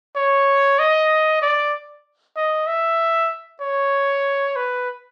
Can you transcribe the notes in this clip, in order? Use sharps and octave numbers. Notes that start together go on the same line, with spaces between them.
C#5
D#5
D5
D#5
E5
C#5
B4